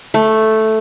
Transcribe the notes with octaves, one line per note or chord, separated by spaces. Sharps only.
A3